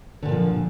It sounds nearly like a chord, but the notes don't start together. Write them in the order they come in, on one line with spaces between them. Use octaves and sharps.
D3 A#2 E3 F3